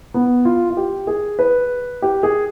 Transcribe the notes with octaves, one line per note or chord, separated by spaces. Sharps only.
B3
F4
F4
G4
G#4
B4
G4
G#4